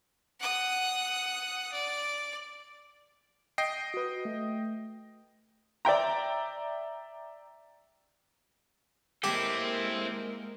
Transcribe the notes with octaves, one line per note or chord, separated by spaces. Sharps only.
F#5 D#6
D5
D#5 G5 C7
F#4 B4
A3
D5 E5 G5 A#5
G#3 A#3 C4 E4 G4 A4 A#4